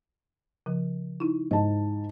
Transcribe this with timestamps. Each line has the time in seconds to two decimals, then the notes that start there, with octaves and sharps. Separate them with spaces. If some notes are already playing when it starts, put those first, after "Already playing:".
0.66 C#3 F3
1.20 D#4 E4
1.51 G#2 D#5 A5